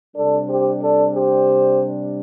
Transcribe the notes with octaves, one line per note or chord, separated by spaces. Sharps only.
C3 G3 D4 A4 D5
G4 C5
A4 D5
G4 C5